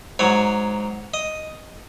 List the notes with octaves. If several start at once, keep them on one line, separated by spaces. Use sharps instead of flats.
G#2 F#3 C#5
D#5